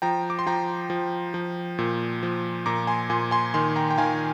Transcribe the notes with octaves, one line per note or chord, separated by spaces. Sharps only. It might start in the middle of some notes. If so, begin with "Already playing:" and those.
F3 G5 A#5
D6
C6
F3 G5 A#5
F3
F3
A#2
F3
A#2 A#5 D6
G#5 C6
A#2 G#5 C6
G#5 C6
D#3 G#5 C6
G5 A#5
G5
D#3 F5 G#5